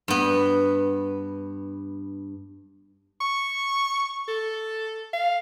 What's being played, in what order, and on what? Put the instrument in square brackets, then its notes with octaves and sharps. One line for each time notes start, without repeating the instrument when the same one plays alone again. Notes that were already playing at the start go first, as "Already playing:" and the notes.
[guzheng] G2 B3
[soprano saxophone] C#6
A4
F5